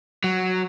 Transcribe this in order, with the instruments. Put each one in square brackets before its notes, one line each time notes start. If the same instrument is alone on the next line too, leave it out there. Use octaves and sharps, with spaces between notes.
[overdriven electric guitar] F#3